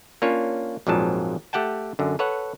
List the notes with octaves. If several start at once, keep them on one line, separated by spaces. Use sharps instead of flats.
A#3 C#4 D4 F4 C#5
A#1 F2 G#2 F3 F#3 A5
A3 G4 F#5 G5 A5
F#2 D3
A4 B4 C#5 F#5